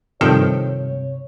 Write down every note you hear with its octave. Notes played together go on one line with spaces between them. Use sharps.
G2 C3 D#3 F3 A4 C#5 G5